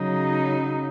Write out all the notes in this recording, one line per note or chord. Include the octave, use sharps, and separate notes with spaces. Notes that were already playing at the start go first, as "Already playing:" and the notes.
Already playing: C#3 F#3 D#4